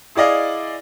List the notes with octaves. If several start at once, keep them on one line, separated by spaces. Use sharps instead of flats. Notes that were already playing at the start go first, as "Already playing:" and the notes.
E4 G#4 D5 D#5 F5